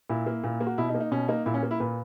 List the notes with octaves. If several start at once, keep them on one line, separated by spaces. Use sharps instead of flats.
A#2 E4
A#3
A#2
A#3
F#4
B2 E4
D#4
A#3
D#4
B2 C#4
A#3 D#4
A#2 E4
C#4
A#3
E4
A#2 B4